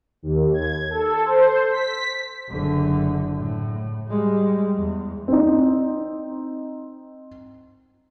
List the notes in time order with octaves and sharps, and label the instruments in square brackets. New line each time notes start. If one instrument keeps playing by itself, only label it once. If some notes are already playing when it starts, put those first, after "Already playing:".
[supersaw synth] D#2
G#6
A4
C5
B6
[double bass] F#1 D3
A2
G3 G#3
E2
[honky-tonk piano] C4 D#4